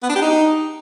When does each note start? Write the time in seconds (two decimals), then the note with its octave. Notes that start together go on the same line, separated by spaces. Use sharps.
0.03 B3
0.09 D4
0.15 G4
0.22 D#4